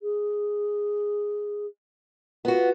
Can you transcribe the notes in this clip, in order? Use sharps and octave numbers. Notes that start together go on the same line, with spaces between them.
G#4
B3 F4 F#4